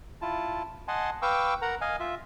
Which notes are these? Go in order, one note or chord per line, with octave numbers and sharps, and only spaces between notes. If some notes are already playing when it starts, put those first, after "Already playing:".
E4 F4 A5
D#5 F#5 G#5 A5 C6
B4 F5 G5 C#6 D6 E6
A#4 F#5 A#5
D#5 F5 G#5
F4 E5